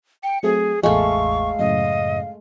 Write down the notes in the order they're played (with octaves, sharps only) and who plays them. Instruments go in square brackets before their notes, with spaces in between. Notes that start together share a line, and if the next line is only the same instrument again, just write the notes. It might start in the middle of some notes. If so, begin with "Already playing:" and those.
[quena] G5 [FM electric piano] C#7
[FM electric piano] F#3 A3 C4 [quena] G#4
[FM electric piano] A1 E2 [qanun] G#3 A3 [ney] F5 [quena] C#6
[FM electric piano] F#2 A2 C#3 [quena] D#5